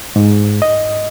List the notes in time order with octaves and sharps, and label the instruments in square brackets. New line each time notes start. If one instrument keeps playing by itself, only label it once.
[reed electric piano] G#2
D#5